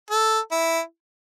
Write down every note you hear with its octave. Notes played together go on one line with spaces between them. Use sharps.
A4
E4